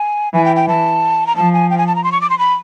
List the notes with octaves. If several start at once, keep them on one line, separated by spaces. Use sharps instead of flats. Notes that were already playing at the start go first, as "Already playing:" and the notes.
Already playing: G#5
E3 G#5
G5
G5
E3 A5
A#5
F3 A5
G#5
G5
G#5
A5
A#5
C6
C#6
D6
C6
B5